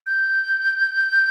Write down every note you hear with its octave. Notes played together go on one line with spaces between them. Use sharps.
G6